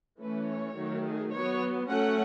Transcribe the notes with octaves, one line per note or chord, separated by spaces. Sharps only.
E3 A3 C#4 B4
C#5
D#3 F#3 A3
G#4
F#3 B3 C#5
F#3 A3 C#4 F#5